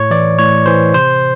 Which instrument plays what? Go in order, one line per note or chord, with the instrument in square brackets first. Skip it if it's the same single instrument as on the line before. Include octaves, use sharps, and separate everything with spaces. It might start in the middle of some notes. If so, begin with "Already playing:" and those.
Already playing: [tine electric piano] A2 C#5
E3 D5
A2 C#5
E3 C5
C3 C5